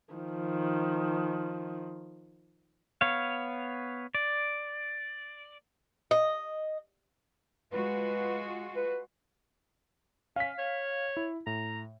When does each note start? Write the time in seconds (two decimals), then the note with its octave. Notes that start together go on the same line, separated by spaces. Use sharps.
0.14 D#3 F3
3.01 B3 C#5 F5
4.15 D5
6.11 D#5
7.73 G#3 F4 F#4 B4
8.76 B4
10.36 C#4 F5 B6
10.58 C#5
11.17 E4
11.47 A2 A#5